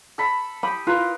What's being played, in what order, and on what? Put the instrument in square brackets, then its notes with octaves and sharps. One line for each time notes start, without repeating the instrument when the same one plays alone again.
[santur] A4 B5
[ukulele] G4 B5 [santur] D#6
[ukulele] F4 [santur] A#4 B4 A#5